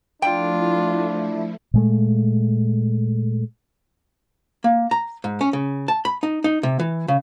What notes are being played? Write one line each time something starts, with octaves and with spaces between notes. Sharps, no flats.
F3 A3 D4 E4 F4 G5
A#2 G#3 A3
A#3
A#5
G#2
C#4
C#3
A5
B5
D#4
D#4
C3
E3
C#3